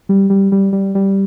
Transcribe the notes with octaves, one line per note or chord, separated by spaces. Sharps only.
G3
G3
G3
G3
G3